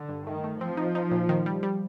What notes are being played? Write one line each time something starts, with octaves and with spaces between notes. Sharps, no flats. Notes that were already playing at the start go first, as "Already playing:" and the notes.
Already playing: D3
G2
D#3 A3
A3
F3 C4
D#4
D#4
A#2
D#3
G3
G3